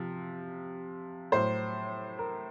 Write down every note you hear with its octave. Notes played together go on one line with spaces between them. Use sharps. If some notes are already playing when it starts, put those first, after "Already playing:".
Already playing: C3 F3
A2 F#3 C5
A#4